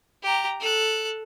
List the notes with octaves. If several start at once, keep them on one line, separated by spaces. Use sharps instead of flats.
G4 A#5
A4 F#6